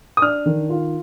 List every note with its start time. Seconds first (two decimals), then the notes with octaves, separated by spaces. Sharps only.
0.17 D#6
0.22 D4 F6
0.46 D#3
0.70 F4